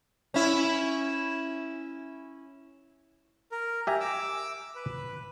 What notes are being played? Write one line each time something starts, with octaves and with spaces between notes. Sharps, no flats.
C#4 E4
A#4
G4 E5 G#5 A#5
D6 E6
B4